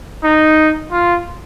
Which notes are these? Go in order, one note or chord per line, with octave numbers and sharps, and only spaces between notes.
D#4
F4